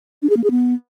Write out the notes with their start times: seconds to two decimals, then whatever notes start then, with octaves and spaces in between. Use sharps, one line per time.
0.22 D4
0.30 G#4
0.37 A#3
0.44 G#4
0.51 B3